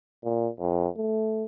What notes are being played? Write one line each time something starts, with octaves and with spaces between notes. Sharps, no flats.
A#2
F2
A3